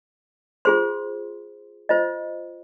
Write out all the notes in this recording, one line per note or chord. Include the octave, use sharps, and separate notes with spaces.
F4 G#4 C5 C6
F4 C5 D#5